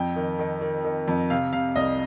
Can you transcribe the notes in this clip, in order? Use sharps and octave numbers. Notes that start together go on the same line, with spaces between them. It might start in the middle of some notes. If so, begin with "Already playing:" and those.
Already playing: F2 G5
D#3
D#3
D#3
D#3
F2
C3 F5
C3 F5
C2 D#5